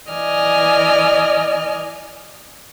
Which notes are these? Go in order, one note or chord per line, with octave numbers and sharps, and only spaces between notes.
E3 D5 D#5 G#5 F6